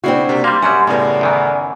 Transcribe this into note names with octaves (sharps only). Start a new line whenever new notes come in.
C#3 C4 D4 E4 F#4 C7
C3 A#3
G3 A#3 F5 C6 G6
F#2 F#3 G3 F#5
A2 C#3 B3 A4 A#4 D5
F#2 D#3 E3